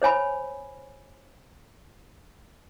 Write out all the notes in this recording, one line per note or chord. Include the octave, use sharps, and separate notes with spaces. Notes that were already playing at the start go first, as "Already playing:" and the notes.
C5 C#5 G#5 B5